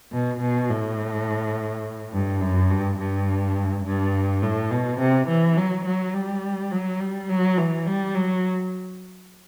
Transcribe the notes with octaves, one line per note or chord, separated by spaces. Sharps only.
B2
B2
A2
G2
F#2
G2
G2
G2
A2
B2
C3
E3
F#3
F#3
G3
F#3
G3
F#3
E3
G3
F#3